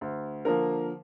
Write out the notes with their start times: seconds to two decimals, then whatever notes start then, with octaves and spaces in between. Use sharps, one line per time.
0.01 D2
0.45 D3 F3 A#3 A#4